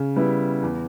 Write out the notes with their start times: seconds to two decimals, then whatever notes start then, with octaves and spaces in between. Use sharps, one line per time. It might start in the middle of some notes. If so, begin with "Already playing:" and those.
Already playing: C#3
0.16 G3 B3 E4
0.63 E2